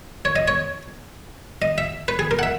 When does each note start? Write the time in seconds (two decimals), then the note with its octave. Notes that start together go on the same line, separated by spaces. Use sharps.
0.25 C#5
0.36 D#5
0.48 C#5
1.62 D#5
1.78 E5
2.08 B4
2.19 G#4
2.31 A#4
2.39 F#5
2.43 E5